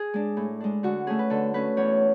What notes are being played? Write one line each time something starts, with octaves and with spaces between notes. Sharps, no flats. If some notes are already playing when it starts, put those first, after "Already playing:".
Already playing: G#4
G#3 D4
A2
G#3 D4
D3 F#4
A3 C#4 G#4
B4
D3 A4
A3 C#4 B4
E2 C#5